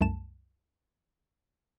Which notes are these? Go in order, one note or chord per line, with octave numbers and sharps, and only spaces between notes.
C2 F#2 A3 A5 E7